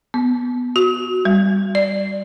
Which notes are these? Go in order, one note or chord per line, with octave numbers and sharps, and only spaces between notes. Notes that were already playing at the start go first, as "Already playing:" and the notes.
B3
F#4
G3
D5